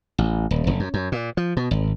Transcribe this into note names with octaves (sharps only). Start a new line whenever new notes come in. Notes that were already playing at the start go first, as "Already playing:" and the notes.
A1
D#1
F1
F#2
F#2
A#2
F3
B2
G#1